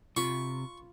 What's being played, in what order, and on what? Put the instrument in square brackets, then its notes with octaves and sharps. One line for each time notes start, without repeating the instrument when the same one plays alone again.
[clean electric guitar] C3 [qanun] F4 B5 [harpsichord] C#6